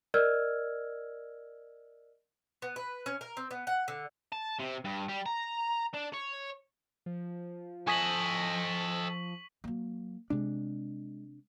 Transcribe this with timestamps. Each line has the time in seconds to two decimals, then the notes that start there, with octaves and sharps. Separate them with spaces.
0.14 A#4 D5 D#5 E6 F6 G#6
2.62 B3
2.76 B4
3.06 C#4
3.21 A#4
3.37 C4
3.51 B3
3.67 F#5
3.88 D3
4.33 A5
4.60 C3
4.85 G2
5.09 G3
5.26 A#5
5.94 D4
6.14 C#5
7.06 F3
7.87 A4 D#5 G#5 C#6 D#6 B6 F#7
9.64 F#3 A#3
10.30 C3 G#3 D4